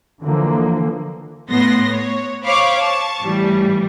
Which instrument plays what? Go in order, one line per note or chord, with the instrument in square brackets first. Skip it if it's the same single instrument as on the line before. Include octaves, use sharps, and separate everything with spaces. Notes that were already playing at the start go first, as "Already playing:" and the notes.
[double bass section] D3 E3 F3 A#3
[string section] A2 B3 C6 A#6
C#5
C5 C#5 F5 B5 C#6 D6
A5 C#6
A2 E3 G3